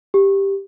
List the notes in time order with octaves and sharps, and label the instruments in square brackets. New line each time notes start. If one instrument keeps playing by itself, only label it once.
[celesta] G4